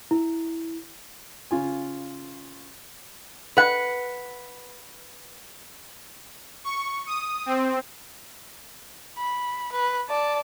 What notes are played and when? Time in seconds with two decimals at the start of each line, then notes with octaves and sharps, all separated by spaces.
0.11 E4
1.51 C#3 F4 G#5
3.57 B4 F#5
6.64 C#6
7.07 D#6
7.46 C4
9.18 B5
9.72 B4
10.10 D5 A5